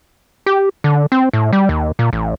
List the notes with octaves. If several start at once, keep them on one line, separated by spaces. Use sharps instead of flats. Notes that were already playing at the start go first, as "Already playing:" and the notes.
G4
D3
C4
A2
G3
D#2
A#2
A1